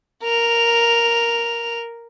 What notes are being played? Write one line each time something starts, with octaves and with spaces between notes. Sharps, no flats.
A#4 F7